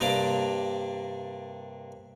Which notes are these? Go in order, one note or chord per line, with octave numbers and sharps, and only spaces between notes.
G2 C3 A#3 D4 A#5 D6